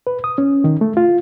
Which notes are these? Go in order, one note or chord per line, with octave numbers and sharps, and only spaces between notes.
B4
D#6
C#4
D#3
A3
F4